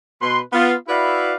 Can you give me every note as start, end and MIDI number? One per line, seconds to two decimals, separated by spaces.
0.21 0.40 47
0.21 0.40 71
0.21 0.40 84
0.53 0.74 59
0.53 0.74 65
0.88 1.35 64
0.88 1.35 66
0.88 1.35 71
0.88 1.35 74
0.88 1.35 76
0.88 1.35 77